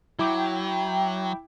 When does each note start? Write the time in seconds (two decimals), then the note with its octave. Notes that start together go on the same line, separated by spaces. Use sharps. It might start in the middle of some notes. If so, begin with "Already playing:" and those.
0.19 F#3 E4 G5 D6